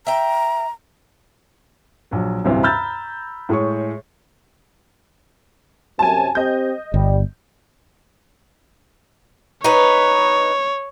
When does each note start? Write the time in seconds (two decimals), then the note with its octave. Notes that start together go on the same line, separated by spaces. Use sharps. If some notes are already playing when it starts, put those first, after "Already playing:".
0.07 E5 G5 A#5
2.11 A#1 F#3
2.44 A1 D2 G2 C3 E3
2.63 A#5 B5 E6 F6 G6 A6
3.49 A2 G#3 G#4 C#5 C#6
5.99 F#2 C3 G#5 A5
6.35 C4 G4 D#5 G6
6.94 G1 G3
9.64 D#4 B4 C#5